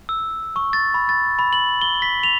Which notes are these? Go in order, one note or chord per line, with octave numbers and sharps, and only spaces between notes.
E6
C#6
A6
B5
A6
B5
F#7
G7
B6
F7